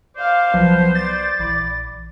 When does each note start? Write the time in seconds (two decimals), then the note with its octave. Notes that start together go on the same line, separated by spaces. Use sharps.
0.17 C5 D5 F5
0.54 C2 F3 F#3 B3 F#6
0.95 D5 A6
1.39 A#1 E3 B5